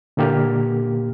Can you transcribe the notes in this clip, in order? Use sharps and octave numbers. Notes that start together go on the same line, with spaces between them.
A#2 D3 A#3 G4 F6